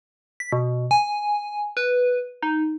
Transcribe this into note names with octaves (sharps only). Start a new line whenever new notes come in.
B6
B2
G#5
B4
D#4